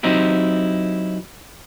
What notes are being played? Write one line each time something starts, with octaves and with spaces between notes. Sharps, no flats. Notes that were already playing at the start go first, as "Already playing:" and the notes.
F#3 C4 D#4 E4 G4